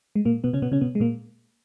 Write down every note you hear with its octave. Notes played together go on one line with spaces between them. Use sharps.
G#3
A#2 A#3
B2 B3
C#3 C#4
B2 B3
C#3 C#4
B2 B3
G#3
A#2 A#3